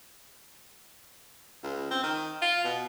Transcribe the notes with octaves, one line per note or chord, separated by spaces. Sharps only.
C#2
C4
D#3
F4
B2